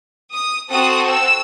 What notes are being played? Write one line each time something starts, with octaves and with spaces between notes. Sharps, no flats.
D#6
C4 F#4 A4 D#6
E6